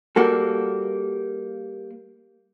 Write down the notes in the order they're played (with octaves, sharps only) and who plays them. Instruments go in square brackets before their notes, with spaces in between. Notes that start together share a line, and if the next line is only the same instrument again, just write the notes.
[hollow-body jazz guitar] G3 A#3 F#4 A4